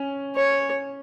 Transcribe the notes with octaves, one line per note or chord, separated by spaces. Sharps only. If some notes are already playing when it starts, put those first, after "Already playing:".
Already playing: C#4
C#5